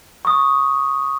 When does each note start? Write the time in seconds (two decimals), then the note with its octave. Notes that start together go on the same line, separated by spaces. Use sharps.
0.25 C#6 D#6